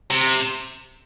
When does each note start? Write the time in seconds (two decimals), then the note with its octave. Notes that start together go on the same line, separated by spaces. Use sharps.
0.11 C3